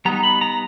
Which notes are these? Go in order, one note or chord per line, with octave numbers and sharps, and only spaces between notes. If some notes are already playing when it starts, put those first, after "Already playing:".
G3 B3 D#4 A#5
B5
A#5